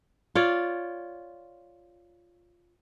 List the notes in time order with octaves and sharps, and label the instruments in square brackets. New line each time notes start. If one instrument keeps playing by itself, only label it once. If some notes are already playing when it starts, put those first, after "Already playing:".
[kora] F4 C#5 D5